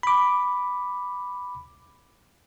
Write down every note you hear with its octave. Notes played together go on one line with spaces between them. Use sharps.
B5 D6